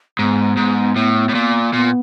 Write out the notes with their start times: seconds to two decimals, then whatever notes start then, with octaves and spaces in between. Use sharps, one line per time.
0.19 G#2 B3
0.57 G#2
0.96 A2
1.29 A2
1.34 A#2
1.73 A#2 B3